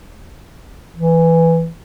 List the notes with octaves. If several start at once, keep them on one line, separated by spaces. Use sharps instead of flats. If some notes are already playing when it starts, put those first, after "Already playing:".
E3